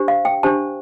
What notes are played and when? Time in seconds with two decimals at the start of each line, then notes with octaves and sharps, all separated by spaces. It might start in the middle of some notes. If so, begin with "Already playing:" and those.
Already playing: D4 G4 C5
0.08 F5
0.25 G5
0.43 D4 G4 C5 A5